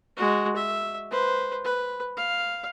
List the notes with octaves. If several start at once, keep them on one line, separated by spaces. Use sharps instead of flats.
G#3 F#4
E5
B4 C5
B4
F5